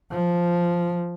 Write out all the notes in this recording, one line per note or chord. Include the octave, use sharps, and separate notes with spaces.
F3